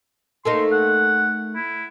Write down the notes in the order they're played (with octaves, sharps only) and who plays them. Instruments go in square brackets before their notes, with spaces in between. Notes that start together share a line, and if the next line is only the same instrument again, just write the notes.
[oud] A3 A#3 D#4 [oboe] C6
[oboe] F#5
E4